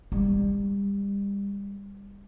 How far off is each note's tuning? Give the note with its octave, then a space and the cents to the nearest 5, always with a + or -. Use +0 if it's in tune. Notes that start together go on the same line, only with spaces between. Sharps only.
G3 +30